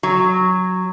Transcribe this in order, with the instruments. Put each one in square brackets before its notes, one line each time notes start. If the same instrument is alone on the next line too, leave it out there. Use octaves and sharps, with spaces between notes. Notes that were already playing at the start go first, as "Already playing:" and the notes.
[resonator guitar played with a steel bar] F#3